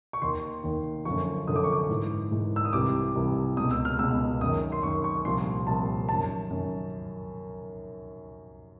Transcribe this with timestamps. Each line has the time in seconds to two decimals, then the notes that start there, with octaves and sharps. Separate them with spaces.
0.13 C#6
0.22 D#2 D#3 C6
0.64 D#2 D#3
1.05 F#2 D3 F3 C#6
1.47 F#2 D3 F3 D#6
1.56 D6
1.64 C#6
1.72 D6
1.89 G#2 E3
2.31 G#2 E3
2.56 E6
2.65 D#6
2.73 C2 C3 E3 D6
3.15 C2 C3 E3
3.57 C#2 B2 D#6
3.71 E6
3.85 F6
3.99 C#2 B2 E6
4.41 F#2 D#3 D#6
4.72 C6
4.83 F#2 D#3 C#6
5.04 C#6
5.25 C2 A#2 F3 C6
5.67 C2 A#2 F3 A5
6.08 F#2 D#3 A5
6.51 F#2 D#3